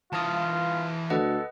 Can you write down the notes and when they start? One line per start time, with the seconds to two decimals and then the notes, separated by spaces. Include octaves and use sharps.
0.13 E3 F4 F5 A5 D#6
1.10 D2 A4 B4 D#5 F#5